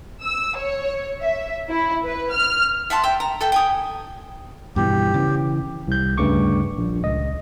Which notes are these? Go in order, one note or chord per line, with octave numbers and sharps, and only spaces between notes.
E6
C#5
E5
E4
B4
F6
E5 F#5 A5 C6
E5 G5
A#5
A4 E5 G5
G5 G#5 D#6
G2 B2 E3 G4
C#3 E3
C2 G6
D2 G2 C#3 A3 C#6 D6
A#1
C#2 D#5